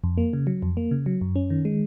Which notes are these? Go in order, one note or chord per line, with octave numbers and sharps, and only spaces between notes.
F2
A#3
C#3
F#3
F2
A#3
C#3
F#3
F#2
C#4
D#3
G#3